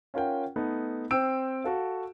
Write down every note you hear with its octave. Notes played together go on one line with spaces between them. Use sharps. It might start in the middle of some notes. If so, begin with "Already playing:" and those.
C#4 F4 A#4 F#5 G5
A3 B3 D#4
C4 C5 G5 E6 D7
F#4 A4 F5